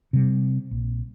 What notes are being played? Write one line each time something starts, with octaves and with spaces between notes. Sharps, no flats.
C3 G3
A#1